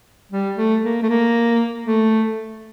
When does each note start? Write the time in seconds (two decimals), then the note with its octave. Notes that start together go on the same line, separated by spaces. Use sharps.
0.32 G3
0.57 A3
0.83 A#3
1.03 A3
1.09 A#3
1.86 A3